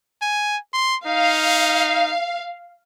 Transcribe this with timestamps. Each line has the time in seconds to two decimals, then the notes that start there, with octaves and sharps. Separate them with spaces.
0.22 G#5
0.74 C6
1.06 D#4 F5